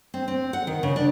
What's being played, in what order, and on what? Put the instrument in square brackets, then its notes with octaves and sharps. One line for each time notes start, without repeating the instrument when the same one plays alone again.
[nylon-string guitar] C4
C4
F#5
D#3
C#3
D4